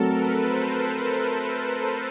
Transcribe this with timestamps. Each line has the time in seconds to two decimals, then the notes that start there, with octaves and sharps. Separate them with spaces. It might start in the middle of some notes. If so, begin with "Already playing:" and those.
Already playing: F#3 A3 C4 A4 A#4
0.10 B4
0.38 C5